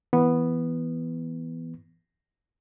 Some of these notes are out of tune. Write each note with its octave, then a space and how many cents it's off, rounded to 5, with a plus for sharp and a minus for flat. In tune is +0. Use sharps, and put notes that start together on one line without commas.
E3 +0 B3 -5